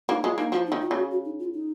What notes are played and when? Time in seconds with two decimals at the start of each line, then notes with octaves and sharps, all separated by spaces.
0.09 A#3 D#4
0.23 G#3 F4
0.38 A#3 D#4
0.52 F3 F4
0.67 D#4
0.72 D#3
0.82 F4
0.91 C#3 F#4
1.11 F#4
1.25 D#4
1.39 F4
1.54 D#4